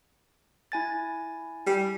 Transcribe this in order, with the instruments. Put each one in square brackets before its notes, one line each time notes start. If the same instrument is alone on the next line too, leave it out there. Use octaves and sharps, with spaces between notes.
[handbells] E4 G#5 A6
[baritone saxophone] G3